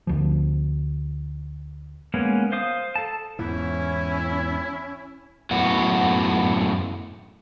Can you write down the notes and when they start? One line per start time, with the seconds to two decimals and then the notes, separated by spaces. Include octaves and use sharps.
0.07 D2 F3
2.14 G#3 A#3 B3 C#4
2.52 C5 F5 D#6
2.95 A4 A5
3.39 E2 G#2 E3 C#4 E4
5.51 F#2 A2 B3 F#4